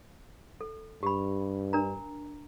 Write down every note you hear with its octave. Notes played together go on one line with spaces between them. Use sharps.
A4
G2 G4 B5
D4 A#4 A#5